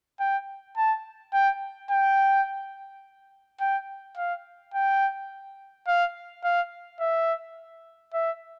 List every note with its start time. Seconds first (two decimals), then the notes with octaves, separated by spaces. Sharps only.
0.20 G5
0.77 A5
1.34 G5
1.91 G5
3.61 G5
4.17 F5
4.74 G5
5.88 F5
6.44 F5
7.00 E5
8.14 E5